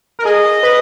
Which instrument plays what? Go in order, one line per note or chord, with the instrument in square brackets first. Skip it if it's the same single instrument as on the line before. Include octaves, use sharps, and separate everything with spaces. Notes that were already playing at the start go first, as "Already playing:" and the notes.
[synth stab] A#4
[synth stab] G#4 [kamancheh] D#5
[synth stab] B4